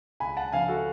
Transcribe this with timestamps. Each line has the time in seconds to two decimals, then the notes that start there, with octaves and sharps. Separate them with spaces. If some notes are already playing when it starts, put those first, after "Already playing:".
0.20 C#2 G#5 B5
0.37 F#5 A5
0.52 C#3 F3 F5 G#5
0.68 F#4 A4